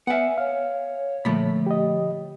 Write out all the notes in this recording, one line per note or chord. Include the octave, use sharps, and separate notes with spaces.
B3 E5 F#5 G#5
C#5 F5
A#2 D3 F3 A3 B5
G4 D#5